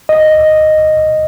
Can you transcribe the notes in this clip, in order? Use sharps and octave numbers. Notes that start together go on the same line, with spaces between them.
D#5